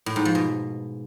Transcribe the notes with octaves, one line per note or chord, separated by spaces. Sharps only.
A2
G#2
F3
B2